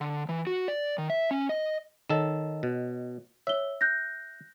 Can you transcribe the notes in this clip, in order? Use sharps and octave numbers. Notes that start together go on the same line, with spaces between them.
D3
E3
F#4
D5
D#3
E5
C#4
D#5
D#3 A4 C#5 D#5 E7
B2
C#5 E5 G7
F#6 G6 A#6